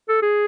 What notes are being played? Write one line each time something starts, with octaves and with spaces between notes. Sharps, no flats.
A4
G#4